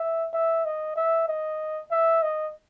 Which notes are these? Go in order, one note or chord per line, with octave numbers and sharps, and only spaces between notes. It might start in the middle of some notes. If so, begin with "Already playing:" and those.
Already playing: E5
E5
D#5
E5
D#5
E5
D#5